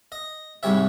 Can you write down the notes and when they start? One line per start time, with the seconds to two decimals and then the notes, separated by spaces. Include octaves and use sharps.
0.12 D#5
0.63 C2 G#2 G3 C#5 E5